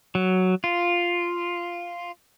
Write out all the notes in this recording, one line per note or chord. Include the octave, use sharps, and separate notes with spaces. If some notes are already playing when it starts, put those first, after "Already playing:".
F#3
F4